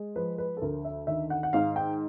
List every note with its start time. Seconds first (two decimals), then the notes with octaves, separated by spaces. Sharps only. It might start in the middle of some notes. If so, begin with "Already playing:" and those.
Already playing: G#3
0.16 F3 B4
0.38 B4
0.57 A4
0.62 D2 A#4
0.85 E5
1.07 D#3 E5
1.30 F#5
1.43 F#5
1.53 G#2 F5
1.76 G5